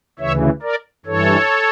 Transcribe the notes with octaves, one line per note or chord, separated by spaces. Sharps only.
D2 C#3 E3 C#5 E5
A#4 D5
G2 E3 A4 C#5